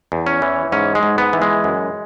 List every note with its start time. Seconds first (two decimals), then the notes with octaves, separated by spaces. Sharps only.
0.12 E2
0.27 C#4
0.42 E3
0.72 G#2 C#4
0.95 G#3
1.03 G#2
1.18 B3
1.33 E3
1.42 G#3
1.64 F#2